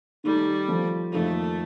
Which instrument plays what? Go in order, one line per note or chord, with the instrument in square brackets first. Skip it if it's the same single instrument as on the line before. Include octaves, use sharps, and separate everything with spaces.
[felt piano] D#3 A3 D#4 [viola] G3
[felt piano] F3 A3 C4
[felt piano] F2 D#3 A#3 F4 A4 [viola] A3